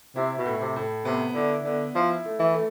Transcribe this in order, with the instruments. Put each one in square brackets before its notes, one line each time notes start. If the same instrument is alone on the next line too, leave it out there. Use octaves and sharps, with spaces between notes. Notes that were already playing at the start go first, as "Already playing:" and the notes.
[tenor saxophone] C3 [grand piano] E4
[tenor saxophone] B2
[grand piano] A2
[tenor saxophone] C3
[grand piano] A2
[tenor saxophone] C3 [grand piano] B3
[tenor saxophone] D3 [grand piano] E4
[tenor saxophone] D3 [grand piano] B3
[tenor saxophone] F3 [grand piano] E4
[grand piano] A3
[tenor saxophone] E3
[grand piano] A3